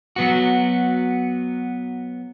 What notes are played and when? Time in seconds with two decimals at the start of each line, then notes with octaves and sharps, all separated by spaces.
0.16 F#3 B3 F#4